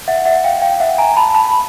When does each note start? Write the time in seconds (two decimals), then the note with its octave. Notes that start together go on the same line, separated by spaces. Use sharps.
0.08 E5 F#5
0.25 E5 F#5
0.44 F5 G5
0.62 F5 G5
0.80 E5 F#5
0.98 G#5 A#5
1.16 A5 B5
1.35 A5 B5